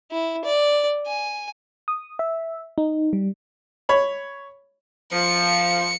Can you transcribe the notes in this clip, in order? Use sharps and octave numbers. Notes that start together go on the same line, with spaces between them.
E4
D5
G#5
D#6
E5
D#4
G3
C#5 B5
F3 C#7